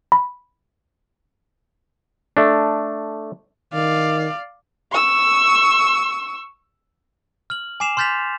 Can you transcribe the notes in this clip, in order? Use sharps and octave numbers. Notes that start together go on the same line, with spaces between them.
B5
A3 D4
D#3 D5 F5
C#6 E6
F6 F#7
G#5 D6 C7 E7 F7
C6 F6 G6 A6 B6 F7